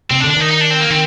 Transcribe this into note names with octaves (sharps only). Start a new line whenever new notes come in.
C3 C4
D4
D3
D4
D#3 D#4
D#4
D4
C4
A#3
D#3 C4